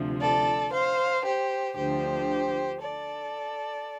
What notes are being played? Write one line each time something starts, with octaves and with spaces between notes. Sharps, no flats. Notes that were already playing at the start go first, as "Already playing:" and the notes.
Already playing: D2 C3 F3
A4 D5
C5 F5
G4 C5
D2 D3 F3 G4 C5
A4 D5